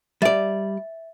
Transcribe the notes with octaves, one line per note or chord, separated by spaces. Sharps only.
G3 D5 E5 A6